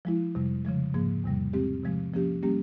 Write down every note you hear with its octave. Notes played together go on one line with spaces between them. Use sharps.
F3 G#3 E4
F2 C3 G3
C#3 F3 G#3
G#2 F3 A#3
E2 C3 G3
G#3 C4 G4
C3 F3 G#3
F3 A#3 C#4 G4
G3 A#3 C#4 G4